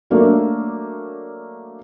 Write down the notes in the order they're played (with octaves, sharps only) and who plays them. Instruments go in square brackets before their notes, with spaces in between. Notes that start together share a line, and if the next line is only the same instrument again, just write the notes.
[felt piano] F#3 A3 A#3 D4